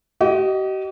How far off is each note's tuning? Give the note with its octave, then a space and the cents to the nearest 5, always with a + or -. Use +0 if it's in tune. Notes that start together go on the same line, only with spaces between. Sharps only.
G4 -45 D#5 +0